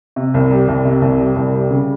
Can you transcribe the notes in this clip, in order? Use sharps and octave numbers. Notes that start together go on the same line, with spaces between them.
C3
C2
G3
C2
C3
C2
G3
C2
G3
C#3